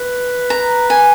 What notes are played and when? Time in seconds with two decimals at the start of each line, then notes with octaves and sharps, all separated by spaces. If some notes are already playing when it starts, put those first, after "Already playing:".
Already playing: B4
0.50 A#5
0.90 G#5